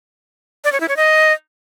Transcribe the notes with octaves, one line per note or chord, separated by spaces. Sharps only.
D5
C#5
E4
C#5
D#5